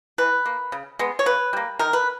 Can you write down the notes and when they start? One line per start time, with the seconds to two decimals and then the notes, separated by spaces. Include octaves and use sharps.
0.18 E3 B4
0.46 A#3
0.72 C#3
0.99 G#3 B3
1.19 C#5
1.26 C#3 B4
1.53 G3 A#3
1.79 D#3 A#4
1.93 B4